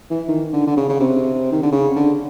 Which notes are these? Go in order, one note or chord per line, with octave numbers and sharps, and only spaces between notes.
E3
D#3
D3
D3
C#3
C#3
C3
D#3
D3
C#3
D3